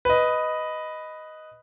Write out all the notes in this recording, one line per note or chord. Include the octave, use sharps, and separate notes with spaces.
B4 D#5